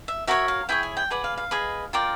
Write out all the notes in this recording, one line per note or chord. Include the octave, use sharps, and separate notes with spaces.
E5
F#4 A#4 C#5 E5
F5
E4 G#4 C#5 G5
G#5
G5
G#4 B4 D5 F#5
F5
F5
G#4 B4 D#5
F4 A#4 D5 G5